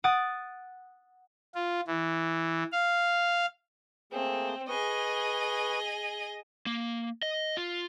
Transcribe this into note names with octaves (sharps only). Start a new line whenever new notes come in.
F#5 D#6 A6 D7
F4
E3
F5
A3 A#3 C4 G#4
G#4 B4 D#5 C#6 D#6
A#3
D#5
F4